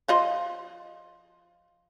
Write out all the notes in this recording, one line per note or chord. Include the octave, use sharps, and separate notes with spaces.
F3 F4 D#5